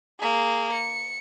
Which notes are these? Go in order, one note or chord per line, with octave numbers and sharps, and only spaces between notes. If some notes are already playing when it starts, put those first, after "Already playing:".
A#3 G#4
C#7